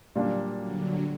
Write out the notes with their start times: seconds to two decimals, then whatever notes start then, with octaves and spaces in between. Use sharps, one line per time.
0.15 A#2 D3 F#3 G3 A#3 D4
0.60 D3 F#3